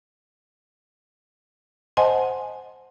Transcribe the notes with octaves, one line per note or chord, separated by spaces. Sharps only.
C5 D#5 F#5 G#5 A5 C6